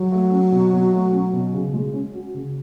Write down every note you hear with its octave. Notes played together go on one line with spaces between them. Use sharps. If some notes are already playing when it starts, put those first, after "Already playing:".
Already playing: F#3
A3
C#4
B2
B2
A3
C#4
B2
C#3
G#3
C#4
F#4
C#3